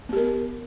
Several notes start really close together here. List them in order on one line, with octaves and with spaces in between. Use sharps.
B3 G4 A#4